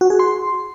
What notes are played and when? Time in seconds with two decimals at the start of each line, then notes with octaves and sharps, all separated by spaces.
0.01 F#4
0.10 G#4
0.19 C6